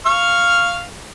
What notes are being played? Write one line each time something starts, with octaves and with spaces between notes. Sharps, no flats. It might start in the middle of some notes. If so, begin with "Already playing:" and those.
F5 C#6 F6